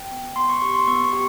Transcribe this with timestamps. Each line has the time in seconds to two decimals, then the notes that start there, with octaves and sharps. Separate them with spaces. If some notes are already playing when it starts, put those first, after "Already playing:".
Already playing: G5
0.12 B3
0.36 B3 C6
0.49 C#6
0.61 G4 C#6
0.74 C6
0.87 B3 C#6
1.04 C#6
1.13 G4